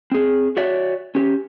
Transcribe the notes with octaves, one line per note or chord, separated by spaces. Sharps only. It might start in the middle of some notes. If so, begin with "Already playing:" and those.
C4 G#4
F#4 C#5 D5 E5
C#4 G4